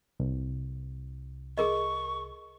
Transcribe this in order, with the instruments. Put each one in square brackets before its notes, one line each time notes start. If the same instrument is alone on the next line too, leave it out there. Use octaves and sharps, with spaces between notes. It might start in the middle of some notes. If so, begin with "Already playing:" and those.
[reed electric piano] C2
[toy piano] G#4 A#4 D#5 [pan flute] C#6